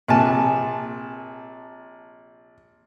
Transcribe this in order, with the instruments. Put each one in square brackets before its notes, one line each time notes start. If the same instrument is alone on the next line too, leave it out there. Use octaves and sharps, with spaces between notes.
[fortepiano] A#1 C3 A5 [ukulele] A#4 B4 G#5